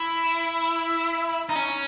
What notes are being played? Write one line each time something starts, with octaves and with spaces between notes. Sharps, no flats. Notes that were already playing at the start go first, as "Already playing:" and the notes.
Already playing: E4
D#4
C#4